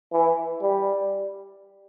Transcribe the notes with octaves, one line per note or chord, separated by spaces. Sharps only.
E3
G3